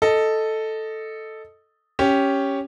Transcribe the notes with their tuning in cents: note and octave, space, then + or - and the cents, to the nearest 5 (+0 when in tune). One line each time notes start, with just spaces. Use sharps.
A4 +0 D#5 +0
C#4 +0 G4 +0